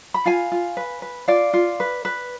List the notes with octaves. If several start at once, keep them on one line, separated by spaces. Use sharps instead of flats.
B5
F4 F5 G#5
F4
B4
B4
F4 D5 F5
F4
B4
B4